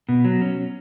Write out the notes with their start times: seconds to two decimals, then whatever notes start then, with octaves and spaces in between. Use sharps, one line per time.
0.09 B2
0.25 F#3
0.41 C#4